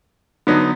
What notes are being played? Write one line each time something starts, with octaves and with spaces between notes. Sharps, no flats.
D3 F#3 B3 D#4